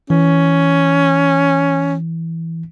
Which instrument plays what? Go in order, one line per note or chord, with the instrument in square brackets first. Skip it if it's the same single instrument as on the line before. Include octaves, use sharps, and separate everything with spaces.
[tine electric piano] E3 [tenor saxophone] C#4